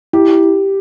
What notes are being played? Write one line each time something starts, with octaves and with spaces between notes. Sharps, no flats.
E4 G4